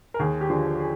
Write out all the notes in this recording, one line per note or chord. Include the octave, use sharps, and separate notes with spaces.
A#4
D#2 G#4
G4
D3 F3 G#4
G#4